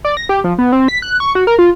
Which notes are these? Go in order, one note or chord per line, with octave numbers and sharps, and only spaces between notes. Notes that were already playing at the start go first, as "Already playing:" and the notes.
D5
A#6
G4
F3
B3
C4
B6
F#6
C#6
F#4
A#4
F4